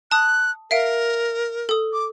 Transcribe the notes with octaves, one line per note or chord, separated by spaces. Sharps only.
A5 D#6 F#6
A#4 E5 F5 D7
A4 D#6
D6